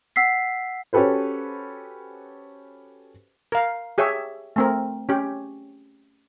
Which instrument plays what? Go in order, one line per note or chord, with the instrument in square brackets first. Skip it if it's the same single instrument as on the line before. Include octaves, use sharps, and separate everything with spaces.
[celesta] F#5 E6 B6 C7
[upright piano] C#4 F#4 G4 A4 B4 C5
[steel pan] A#4 F5
G4 G#4 C#5 E5
A3 C4 A#4
C#4 G4